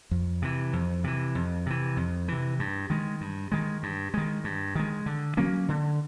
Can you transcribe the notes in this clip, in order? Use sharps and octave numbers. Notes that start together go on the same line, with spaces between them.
F2
C3 E3
F2
C3 E3
F2
C3 E3
F2
C3 E3
G2
D#3 G#3
G2
D#3 G#3
G2
D#3 G#3
G2
D#3 G#3
D3
F#3 A#3 C#4
D3